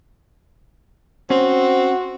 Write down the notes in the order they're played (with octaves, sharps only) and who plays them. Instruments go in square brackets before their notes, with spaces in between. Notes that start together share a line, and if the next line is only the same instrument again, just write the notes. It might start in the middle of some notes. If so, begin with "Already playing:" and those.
[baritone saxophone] C4 [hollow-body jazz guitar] C#4 [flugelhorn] F#4